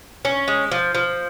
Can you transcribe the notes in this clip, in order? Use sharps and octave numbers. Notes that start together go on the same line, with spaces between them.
C#4
G#3
F3
F3